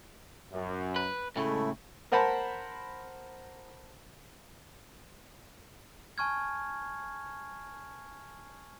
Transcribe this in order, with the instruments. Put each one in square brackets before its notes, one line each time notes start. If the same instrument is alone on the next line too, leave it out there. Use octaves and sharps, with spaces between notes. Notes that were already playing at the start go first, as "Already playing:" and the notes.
[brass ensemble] F#2
[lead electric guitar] B4
[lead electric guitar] A2 C#3 [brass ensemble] G#3 A4 [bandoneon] A3 E4
[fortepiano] A#4 C5 F#5 A5 B5
[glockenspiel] G#5 A5 C#6 F6 G#6